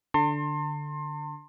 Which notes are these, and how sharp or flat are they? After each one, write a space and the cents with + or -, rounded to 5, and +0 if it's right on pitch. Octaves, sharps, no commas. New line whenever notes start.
D3 +0 A5 +45 C6 +25